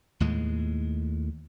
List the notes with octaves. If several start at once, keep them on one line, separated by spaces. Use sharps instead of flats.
D#2 A2 G#3